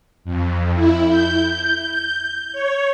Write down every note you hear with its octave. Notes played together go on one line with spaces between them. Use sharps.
F2
E4
G6
C#5